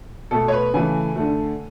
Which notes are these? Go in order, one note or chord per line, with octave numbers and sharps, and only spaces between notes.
B2 A3 A4
C#5
B4
C#3 E3 A3 G#5
D3 A3